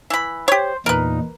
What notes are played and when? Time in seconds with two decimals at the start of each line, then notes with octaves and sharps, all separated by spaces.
0.10 E3 B5
0.48 G4 C5 C#5
0.86 E2 A#2 D#4 A#4 B4